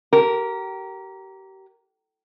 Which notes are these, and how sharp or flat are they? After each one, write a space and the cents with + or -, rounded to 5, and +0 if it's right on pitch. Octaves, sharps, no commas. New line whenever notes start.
G4 -30 A#4 +0